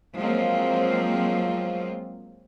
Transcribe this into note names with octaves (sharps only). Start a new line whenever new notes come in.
F3 F#3 G#3 A#3 C4 F4